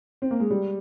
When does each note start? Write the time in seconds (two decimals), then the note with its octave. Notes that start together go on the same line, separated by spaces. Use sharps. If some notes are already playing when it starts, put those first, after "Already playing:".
0.22 C4
0.31 A#3
0.40 G#3
0.50 G3